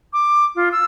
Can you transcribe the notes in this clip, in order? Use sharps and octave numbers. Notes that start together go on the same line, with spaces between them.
D6
F4
E6